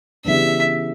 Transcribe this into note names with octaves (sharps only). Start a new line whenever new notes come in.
C#3 E3 G3 B3 D4 E5